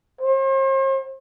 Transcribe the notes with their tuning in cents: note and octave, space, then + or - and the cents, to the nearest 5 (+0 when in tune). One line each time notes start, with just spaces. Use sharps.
C5 +45